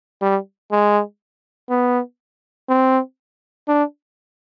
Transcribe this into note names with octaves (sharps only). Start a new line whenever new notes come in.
G3
G#3
B3
C4
D4